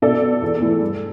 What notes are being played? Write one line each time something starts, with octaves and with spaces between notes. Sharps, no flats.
B2 A4 D5
B3
E2
E3 A3
G2